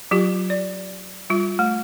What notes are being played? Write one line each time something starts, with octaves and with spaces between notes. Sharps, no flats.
F#3 F4 G4
D5
G3 F4
A3